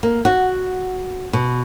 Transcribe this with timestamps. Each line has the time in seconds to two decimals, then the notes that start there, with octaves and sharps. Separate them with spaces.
0.03 A#3
0.25 F#4
1.33 B2